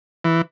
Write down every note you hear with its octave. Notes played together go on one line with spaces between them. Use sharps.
E3